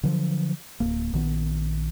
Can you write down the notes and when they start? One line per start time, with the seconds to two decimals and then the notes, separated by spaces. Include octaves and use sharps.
0.03 D3 F3 F#3
0.80 D1 E2 A#3
1.13 A#1 D#3 F3 B3